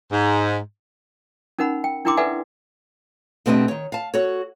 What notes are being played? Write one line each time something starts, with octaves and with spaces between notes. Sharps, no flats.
G#2
C#4 D#4 A#4 F#5 B5
G5
D4 E4 A#4 G5 C6 D6
A4 B4 D5 E5 F#5 G#5
B2 A3 C4 D4 G4 D#5
D#3 C#5
F5 A5
F#4 A4 C#5